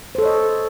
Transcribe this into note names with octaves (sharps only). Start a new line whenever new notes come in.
A4 C5 C#5 D#5